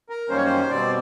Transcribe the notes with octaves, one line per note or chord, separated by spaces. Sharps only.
A#4
F#2 D#3 G3 A#3 C#4 C5
C#5
C5
B2 G3 C4 D5